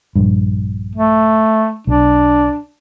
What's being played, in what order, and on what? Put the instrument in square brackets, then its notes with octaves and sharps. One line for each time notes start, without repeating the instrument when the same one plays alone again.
[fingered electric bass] A#1 G2
[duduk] A3
[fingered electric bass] B1 [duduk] D4